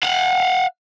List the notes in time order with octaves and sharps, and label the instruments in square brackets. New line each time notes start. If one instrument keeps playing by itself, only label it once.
[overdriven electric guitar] F5 F#5